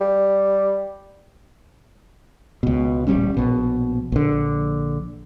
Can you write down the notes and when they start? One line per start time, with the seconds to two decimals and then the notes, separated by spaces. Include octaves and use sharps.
0.01 G3
2.63 C#2 B2
3.07 D1 A#1 G3 C#4
3.37 A#1 B2
4.12 A#1 D3